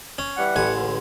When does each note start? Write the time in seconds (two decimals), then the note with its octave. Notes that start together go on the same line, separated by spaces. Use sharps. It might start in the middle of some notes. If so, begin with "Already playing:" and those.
0.19 C#4
0.37 E3 G3 F#5
0.56 A1 G#5
0.75 C#2 D3